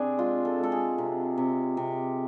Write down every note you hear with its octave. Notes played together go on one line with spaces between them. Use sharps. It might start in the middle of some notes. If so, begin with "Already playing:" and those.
Already playing: C3 C4 D4 G#4
G#3 F4
A4
G#3
A4
G#4
C3
C3
C3